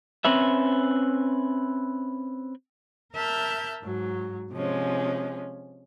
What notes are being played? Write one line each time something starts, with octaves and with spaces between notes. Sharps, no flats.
C4 C#4 B4 E5
A#4 E5 A5 F6 G6
G#2 F#3
C3 F3 G#3 C#4